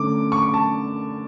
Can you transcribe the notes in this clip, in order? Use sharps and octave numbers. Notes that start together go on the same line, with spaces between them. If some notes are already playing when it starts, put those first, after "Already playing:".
Already playing: D3 A3 C#4 D6
C#6
C#6
A5